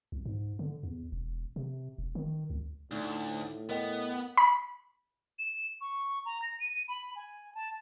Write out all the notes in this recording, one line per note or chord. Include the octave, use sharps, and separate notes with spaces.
C2
G#2
D3
E2
E1
C3
E1
D#3
C#2
D2 A2 D#4
B3 A#4 D#5 G5
B5
E7
C#6
A#5
A#6
D#7
B5
G#5
A5